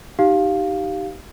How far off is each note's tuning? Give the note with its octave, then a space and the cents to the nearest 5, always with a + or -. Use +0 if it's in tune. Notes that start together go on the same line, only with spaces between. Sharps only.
D#4 +0 G4 -20 F5 +5